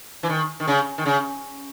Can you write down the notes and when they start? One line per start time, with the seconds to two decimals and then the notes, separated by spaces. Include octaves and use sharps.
0.23 E3
0.29 D#3
0.60 D#3
0.68 C#3
0.98 D#3
1.05 C#3